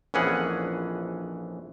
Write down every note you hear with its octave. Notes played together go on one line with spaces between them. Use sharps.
A#1 F2 E3 C#4 G#4 F#5